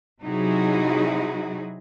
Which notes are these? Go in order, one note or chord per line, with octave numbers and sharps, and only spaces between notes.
C3 F#3 D#4 E4 F#4 G#4